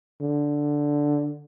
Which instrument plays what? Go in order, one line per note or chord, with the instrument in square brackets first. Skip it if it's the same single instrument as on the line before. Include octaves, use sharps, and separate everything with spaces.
[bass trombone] D3